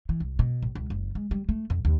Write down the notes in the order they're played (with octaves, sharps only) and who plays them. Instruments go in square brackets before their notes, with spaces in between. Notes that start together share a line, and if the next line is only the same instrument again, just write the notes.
[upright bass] E3
C2
B2
A1
C#2
F#1
G#3
G3
A3
F2
D#2